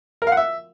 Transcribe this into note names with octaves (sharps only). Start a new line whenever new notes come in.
A#4
F5
F#5
E5